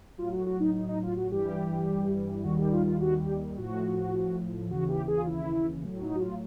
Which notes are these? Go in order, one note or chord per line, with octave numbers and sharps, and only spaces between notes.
A2 F#3 F4
F#4
F#4
D#4
D#4
D#4
F4
F#4
G2 E3 G3 G4
D#2 D#3 G3 F#4
G4
F4
F4
F#4
G4
A2 F3 F#4
D#2 C#3 E3 F#4
G4
G#4
F4
E4
A2 F#3
D#4
F#4
F4